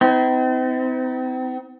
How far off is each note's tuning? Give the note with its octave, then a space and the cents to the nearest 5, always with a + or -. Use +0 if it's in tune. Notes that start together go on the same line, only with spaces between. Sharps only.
C4 -40 D#4 +45